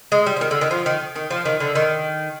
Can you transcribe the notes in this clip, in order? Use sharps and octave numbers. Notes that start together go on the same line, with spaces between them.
G#3
G3
F3
D#3
D3
D#3
F3
D#3
D#3
F3
D#3
D3
D#3